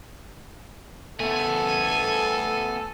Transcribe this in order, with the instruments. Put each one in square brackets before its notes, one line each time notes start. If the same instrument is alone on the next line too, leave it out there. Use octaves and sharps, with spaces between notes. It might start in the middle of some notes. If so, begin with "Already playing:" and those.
[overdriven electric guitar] A3 B3 [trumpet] A4 [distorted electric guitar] G#5